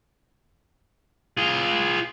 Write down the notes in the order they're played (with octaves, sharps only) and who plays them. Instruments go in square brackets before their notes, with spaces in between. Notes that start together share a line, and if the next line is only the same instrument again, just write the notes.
[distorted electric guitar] F4 G#4